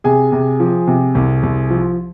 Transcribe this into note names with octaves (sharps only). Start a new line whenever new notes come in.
C3 G#4 G#5
C3
F3
C3
C2
C2
F3